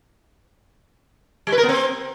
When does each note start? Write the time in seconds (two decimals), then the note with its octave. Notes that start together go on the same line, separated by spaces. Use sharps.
1.47 G3
1.52 B4
1.58 A#4
1.63 B3
1.69 C4